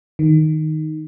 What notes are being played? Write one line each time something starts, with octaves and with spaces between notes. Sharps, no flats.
D#3